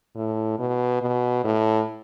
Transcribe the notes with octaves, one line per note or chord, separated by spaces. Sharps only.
A2
B2
B2
A2